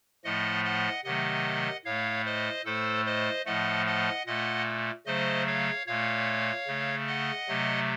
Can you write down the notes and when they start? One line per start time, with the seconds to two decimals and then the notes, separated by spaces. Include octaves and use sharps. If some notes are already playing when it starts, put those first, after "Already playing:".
0.25 A2 F3 A3 D#5 F#5
0.64 D#5 F#5
1.04 C3 D#3 F#3 A3 D#5 F#5
1.85 A2 A3 C#5 F5
2.25 C5 D#5
2.65 A2 A3 A4 C5
3.05 C5 D#5
3.45 A2 F3 A3 D#5 F#5
3.86 D#5 F#5
4.26 A#2 A3 D#5 F#5
5.06 C#3 F#3 A3 C5 D#5
5.47 C#5 F5
5.86 A#2 A3 C#5 F5
6.67 C#3 A3
7.07 D#5 F#5
7.48 C3 F#3 A3